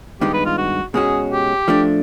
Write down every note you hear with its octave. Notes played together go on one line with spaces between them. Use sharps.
G2 D#3 G#3 B3 D#4 G4
B4
F4
F#4
B2 G#3 C#4 F#4 G#4
G4
F3 A3 D4